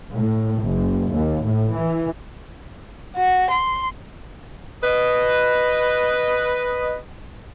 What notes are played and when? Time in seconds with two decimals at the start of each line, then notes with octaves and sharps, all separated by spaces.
0.13 A2
0.63 F#1
1.09 D#2
1.43 A2
1.75 E3
3.17 F#4
3.51 C6
4.83 B4 D#5